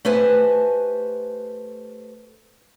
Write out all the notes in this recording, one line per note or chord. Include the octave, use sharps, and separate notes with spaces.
A3 G4 B4 C5 G#5 A5